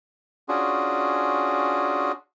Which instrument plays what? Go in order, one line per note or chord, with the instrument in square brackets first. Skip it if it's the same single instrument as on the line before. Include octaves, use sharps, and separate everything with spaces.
[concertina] C#4 D4 F4 F#4 G#4